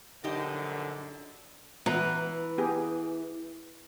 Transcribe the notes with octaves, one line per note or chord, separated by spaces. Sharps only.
A#1 F#2 D3 D#4 G4 D#5
E3 B3 B4 A#5
B3 G4 G#4